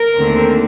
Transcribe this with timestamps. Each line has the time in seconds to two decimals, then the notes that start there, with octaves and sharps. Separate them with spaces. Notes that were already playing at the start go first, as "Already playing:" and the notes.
Already playing: A#4
0.18 D#2 D3 A3 C4